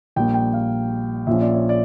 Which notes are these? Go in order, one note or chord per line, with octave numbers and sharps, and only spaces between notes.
A#1 A#2 G3 A#3 G5
G5
F5
A#1 A#2 F3 C#4 E5
D5
C#5
D5